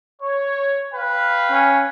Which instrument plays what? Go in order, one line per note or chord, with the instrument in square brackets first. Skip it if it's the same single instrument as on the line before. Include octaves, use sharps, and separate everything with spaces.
[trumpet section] C#5
B4 F5 G5
[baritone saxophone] C#4